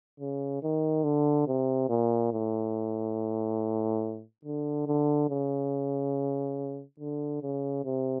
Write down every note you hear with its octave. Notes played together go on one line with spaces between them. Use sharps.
C#3
D#3
D3
C3
A#2
A2
D3
D3
C#3
D3
C#3
C3